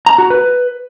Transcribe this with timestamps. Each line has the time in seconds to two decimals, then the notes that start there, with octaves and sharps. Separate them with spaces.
0.06 A#5
0.18 F#4
0.30 B4